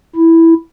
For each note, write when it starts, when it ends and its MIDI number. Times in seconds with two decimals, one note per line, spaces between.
0.16 0.54 64